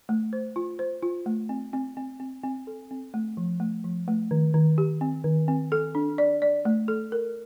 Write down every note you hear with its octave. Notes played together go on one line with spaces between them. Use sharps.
A3
C5
F4
C5
F4
A3
C4
C4
C4
C4
C4
A4
C4
A3
F3
A3
F3
A3
D#3
D#3
G4
C4
D#3
C4
A4
D4
D5
D5
A3
A4
A#4